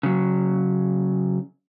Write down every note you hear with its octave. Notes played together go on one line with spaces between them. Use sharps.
C#3 F#3